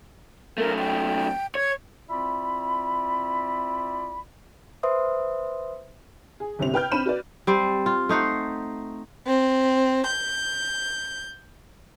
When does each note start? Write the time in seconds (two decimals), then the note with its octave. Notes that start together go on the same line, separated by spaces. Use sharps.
0.58 F#2 A3 A#4
0.79 G5
1.55 C#5 G#6
2.09 C4 E4 F4 D5 E5 B5
4.83 B4 C5 E5 C6 D#6
6.40 G#4
6.59 G1 C2 C3 C4 F7
6.74 B4 G5 F6 G6
6.91 C4 D4 B5 D#7 E7
7.06 F#4 B4 D5
7.47 G3 C4 C5
7.86 F4
8.09 A3 D#4 C5 F#5
9.27 C4
10.07 G6